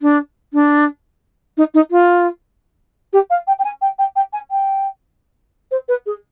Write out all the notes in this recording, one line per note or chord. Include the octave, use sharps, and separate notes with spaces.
D4
D4
D#4
D#4
F4
G4
F5
G5
G5
G#5
G5
G5
G5
G#5
G5
C5
B4
G#4